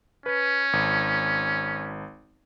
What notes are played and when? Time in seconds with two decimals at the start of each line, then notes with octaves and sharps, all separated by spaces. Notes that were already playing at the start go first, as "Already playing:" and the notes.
0.26 C#4 B4
0.73 G#1